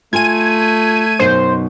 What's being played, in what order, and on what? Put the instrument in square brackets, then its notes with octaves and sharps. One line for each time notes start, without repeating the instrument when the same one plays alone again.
[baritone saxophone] A3 [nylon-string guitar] F4 G#5 [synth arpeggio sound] G#6 D#7
[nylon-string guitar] F#2 B2 D#4 [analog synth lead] C5